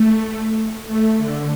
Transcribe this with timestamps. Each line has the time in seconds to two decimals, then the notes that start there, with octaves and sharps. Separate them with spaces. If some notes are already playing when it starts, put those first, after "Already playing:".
Already playing: A3
0.88 A3
1.18 D3